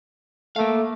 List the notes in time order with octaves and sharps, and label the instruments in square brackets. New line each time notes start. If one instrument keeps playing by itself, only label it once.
[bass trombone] A3 [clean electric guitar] A#3 F5